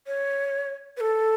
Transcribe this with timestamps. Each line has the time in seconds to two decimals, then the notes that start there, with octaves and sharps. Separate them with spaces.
0.07 C#5
0.97 B4
1.01 A4